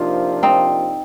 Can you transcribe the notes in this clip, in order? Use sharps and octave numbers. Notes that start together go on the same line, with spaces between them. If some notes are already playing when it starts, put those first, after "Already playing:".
Already playing: C3 F3 A#3 D4 D#4 F4
C4 D#4